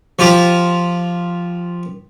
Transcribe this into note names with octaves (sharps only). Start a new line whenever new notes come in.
F3 F4 G4